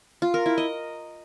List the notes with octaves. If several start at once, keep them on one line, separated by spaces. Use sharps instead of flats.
F4
A#4
E4
D#5